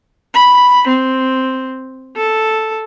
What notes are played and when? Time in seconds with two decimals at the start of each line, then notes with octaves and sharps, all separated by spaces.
0.34 B5
0.87 C4
2.16 A4